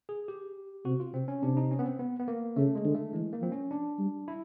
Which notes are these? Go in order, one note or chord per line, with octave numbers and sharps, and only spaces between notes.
G#4
G4
C3 F#4
F4
C3 C4
C#4
C3 D4
D#4
C#4
B3
C4
B3
B3
A#3
C#3 A3
G#3
D3
A3
E3 G#3
A#3
F3 C4
C#4
D4
G3
E4